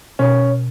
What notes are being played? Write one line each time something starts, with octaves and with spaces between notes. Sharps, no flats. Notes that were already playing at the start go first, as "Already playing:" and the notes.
B2 C#4